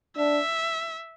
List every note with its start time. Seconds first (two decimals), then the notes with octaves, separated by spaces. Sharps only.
0.17 D4 E5